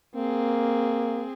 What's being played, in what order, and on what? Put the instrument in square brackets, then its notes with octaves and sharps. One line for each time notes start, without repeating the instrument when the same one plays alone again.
[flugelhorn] A#3 [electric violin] C4 G#4